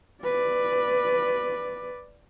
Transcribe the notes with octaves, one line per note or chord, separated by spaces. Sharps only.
B4 D5